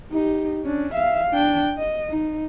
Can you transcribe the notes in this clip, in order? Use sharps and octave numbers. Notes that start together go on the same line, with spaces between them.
D#4 G4
C#4 D4
E5 F5
D4 G5
D#5
D#4